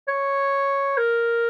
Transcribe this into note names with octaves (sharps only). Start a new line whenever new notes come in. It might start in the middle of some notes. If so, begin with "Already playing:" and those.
C#5
A#4